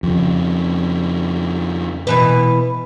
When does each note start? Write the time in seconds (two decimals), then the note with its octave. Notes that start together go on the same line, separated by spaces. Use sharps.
0.03 F2 C#3
2.07 B2 E3 B4